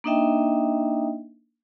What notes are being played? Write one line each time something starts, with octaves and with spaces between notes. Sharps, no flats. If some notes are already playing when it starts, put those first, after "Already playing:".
A#3 D4 D#4 D#5 E5 G5